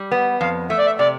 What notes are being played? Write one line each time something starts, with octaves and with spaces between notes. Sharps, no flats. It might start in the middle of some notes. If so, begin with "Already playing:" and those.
Already playing: G3
B3
F2 F5
A3 E5
D5
E5
C3 D5